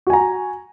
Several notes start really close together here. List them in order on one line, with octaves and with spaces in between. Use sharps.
F#4 G#5 A#5